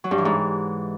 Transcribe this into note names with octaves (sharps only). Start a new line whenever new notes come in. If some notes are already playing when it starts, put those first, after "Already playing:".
F#3
G2
E3
G#2